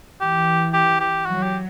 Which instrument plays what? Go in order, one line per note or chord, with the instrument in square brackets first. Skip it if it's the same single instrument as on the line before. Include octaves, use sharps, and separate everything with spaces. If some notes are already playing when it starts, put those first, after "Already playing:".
[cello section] E3 [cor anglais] G4
[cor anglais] G4
G4
[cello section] F#3 [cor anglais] F#4
[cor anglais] G4